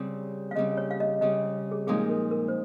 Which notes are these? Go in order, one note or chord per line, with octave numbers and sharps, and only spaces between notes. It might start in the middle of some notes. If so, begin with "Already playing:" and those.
Already playing: C#3 G3 C4
F5
C#3 G3 C4 D#5
C#5
F5
D#5
C#3 G3 C4 D#5
G#4
A#2 F3 G#3 C4 D#4 G#4
A#4
A#4
C5